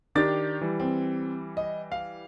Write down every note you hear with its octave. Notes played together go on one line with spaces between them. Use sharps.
D#3 D4 G4 D6 A6
E3 G3
C4
D#5
F5